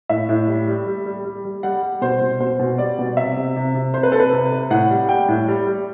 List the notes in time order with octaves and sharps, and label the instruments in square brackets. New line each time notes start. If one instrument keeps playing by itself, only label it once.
[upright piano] A2 E5
A2
G3
G3
G3
G3
G3
G3
G3 F#5
G3
B2 C5
B2
B2 C5
B2
G3 D5
B2
C3 E5
C3
C3
C3
C3 C5
B4
C3 A4
B4
C3
C3
A2 F#5
G3
G3 G5
A2
G3
G3